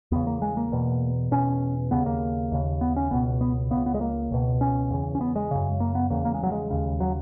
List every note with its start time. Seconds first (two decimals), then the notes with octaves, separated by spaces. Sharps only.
0.12 E2 C#3 B3
0.27 A#3
0.42 G#3
0.57 A#3
0.72 E2 B2
1.31 E2 B2 C#4
1.91 D#2 C#3 B3
2.06 A#3
2.52 D#2 C#3
2.81 B3
2.96 C#4
3.11 C#2 B2 B3
3.41 B3
3.71 C#2 C#3 B3
3.86 B3
3.94 G#3
4.01 A#3
4.31 C#2 B2
4.61 C#4
4.90 E2 C#3
5.15 C#4
5.21 B3
5.36 G#3
5.51 F#2 C#3
5.80 A#3
5.95 B3
6.10 E2 C#3 A#3
6.25 A#3
6.34 G#3
6.43 F#3
6.52 G#3
6.70 D#2 C#3
7.00 F#3